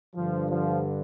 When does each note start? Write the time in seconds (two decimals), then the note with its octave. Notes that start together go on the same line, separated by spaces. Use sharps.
0.16 G2 D3 F3
0.50 F3